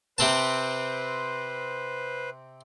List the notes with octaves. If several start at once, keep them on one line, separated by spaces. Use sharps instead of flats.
C3 C4 B4 C5 A5